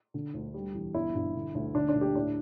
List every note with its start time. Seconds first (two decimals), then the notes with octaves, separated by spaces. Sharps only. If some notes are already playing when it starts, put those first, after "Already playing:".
0.14 D3
0.34 D2
0.54 G3
0.74 E2
0.94 G1 E4
1.15 G2
1.35 D3
1.55 D2
1.75 D3 D4
1.89 D4
1.95 D2
2.01 G4
2.15 A2 D4